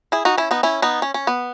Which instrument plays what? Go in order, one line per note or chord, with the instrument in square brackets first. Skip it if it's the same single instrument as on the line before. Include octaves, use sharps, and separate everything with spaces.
[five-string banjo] E4 G#4
D#4 F#4
C#4 E4
B3 D#4
C#4 E4
B3 D#4
C#4
C#4
B3